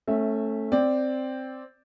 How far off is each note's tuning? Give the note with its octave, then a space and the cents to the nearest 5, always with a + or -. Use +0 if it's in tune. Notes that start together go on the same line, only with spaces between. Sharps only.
A3 +5 C#4 -25 E5 -10
C4 +0 D5 +0